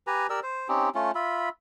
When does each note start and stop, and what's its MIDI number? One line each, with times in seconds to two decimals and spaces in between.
0.07 0.27 67
0.07 0.27 71
0.07 0.27 80
0.07 0.27 82
0.30 0.40 67
0.30 0.40 70
0.30 0.40 74
0.30 0.40 88
0.43 0.68 72
0.69 0.89 60
0.69 0.89 61
0.69 0.89 63
0.69 0.89 67
0.95 1.11 57
0.95 1.11 61
0.95 1.11 65
1.15 1.49 65
1.15 1.49 76
1.15 1.49 83